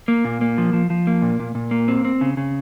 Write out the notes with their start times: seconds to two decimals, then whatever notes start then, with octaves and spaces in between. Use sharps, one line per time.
0.08 A#3
0.25 A#2
0.41 A#3
0.58 F3
0.73 F3
0.90 F3
1.07 A#3
1.22 A#2
1.40 A#2
1.55 A#2
1.71 A#3
1.88 C4
2.05 C4
2.21 C#3
2.37 C#3